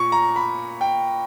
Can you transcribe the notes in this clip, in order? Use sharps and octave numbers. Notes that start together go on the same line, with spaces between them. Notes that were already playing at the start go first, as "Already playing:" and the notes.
Already playing: A#2 C#6
A#5
B5
G5